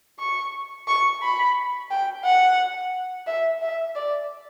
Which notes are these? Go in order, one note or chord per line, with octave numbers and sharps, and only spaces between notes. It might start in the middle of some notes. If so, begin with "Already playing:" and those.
C#6
C#6
B5
G5
F#5
E5
E5
D5